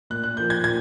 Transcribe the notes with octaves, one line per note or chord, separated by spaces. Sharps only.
A#2 F#6
F#6
F3 A#3 G6
G#6
A#2 G#6